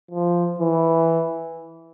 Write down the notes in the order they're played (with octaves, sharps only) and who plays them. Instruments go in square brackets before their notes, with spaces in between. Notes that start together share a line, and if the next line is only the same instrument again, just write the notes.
[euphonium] F3
E3